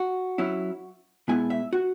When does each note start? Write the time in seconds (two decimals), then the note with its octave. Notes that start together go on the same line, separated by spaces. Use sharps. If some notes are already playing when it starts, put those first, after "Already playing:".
Already playing: F#4
0.38 F#3 C#4 E4
1.28 B2 G#3 B3 E4 G#5
1.50 E5
1.73 F#4